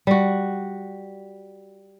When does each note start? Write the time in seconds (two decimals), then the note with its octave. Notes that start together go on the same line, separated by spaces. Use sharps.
0.07 G3 F#4